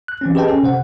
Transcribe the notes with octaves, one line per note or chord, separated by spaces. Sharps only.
F#6
E3 C4 C#4
G4 G#4 B4 D#5 G5 A5
C#4 A4
C3 C5 F#5